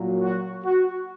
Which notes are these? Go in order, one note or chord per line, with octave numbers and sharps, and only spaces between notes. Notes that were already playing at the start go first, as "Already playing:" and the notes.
Already playing: A#2 F#3
F#4
F#4